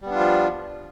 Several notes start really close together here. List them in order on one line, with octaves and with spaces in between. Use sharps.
G3 B3 D4 F4 F3